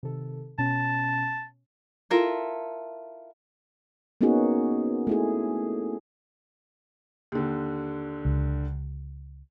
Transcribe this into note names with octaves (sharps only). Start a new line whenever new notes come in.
C3 D#3 A4
B2 C#4 A5
E4 F4 A4 A#4
A#3 B3 C#4 D#4 F#4 G#4
A3 E4 G#4
D#2 D3
C#2